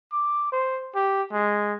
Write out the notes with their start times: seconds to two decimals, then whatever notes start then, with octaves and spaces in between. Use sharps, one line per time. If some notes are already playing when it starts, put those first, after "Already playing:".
0.13 D6
0.52 C5
0.95 G4
1.33 G#3